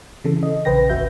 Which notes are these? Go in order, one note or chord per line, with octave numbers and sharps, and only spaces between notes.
C#3 E3 A4
D#5
A#1 C#3 B4 C5 G5 A#6
G#1 D2 F#4 B4 E5 G6